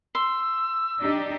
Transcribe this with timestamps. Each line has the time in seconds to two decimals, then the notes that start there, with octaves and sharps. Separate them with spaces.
0.15 C6 E6
1.00 D4 D#4 G4